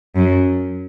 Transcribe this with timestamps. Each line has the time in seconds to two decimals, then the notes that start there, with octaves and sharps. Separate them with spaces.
0.16 F#2